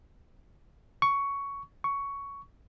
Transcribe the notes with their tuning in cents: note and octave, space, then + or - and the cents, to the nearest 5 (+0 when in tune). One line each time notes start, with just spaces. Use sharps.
C#6 +10
C#6 +10